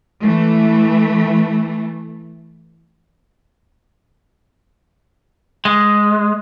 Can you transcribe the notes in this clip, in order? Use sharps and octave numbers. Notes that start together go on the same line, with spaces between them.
E3 A3
G#3